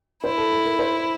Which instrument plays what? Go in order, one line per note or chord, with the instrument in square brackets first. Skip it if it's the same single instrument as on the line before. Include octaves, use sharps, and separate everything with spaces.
[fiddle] E4 [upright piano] C5
[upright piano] A4
A4
A#4
C5